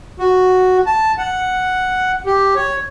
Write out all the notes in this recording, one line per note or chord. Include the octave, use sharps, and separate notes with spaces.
F#4
A5
F#5
G4
C#5